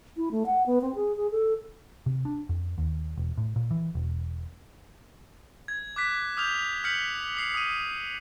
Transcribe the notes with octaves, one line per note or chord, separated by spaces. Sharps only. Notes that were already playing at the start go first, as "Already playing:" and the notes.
E4
A3
F#5
B3
C4
G#4
G#4
A4
C3
D4
F2
D#2
E1
A2
A#2
E3
E1
G#6
D6 F#6 B6
D6 D#6 F6 G6 F7
F6 G6 B6 C#7 F#7
D#6 C7
D#6 D#7